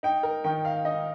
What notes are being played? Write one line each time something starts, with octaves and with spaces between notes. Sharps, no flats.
D#4 G5
A#4
D#3 G5
F5
D#4 D#5